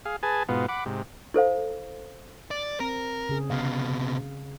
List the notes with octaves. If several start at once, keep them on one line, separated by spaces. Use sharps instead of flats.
G#4 F5
G#4 B4 G#5 A5
G#2 B2 B3 F4
F#5 B5 D6
G#2 C3
E4 A4 C5 F5
D5
C4 A#4
C#3 G#4
C3 B3 F5